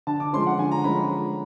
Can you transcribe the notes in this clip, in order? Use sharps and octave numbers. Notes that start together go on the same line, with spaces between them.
D3 A5
D6
F3 G#3 C#4 C6
F#5
D3 G#5
A#5
F3 G#3 C#4 B5